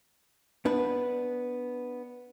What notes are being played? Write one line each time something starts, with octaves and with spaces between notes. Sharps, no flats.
B3 D4 B4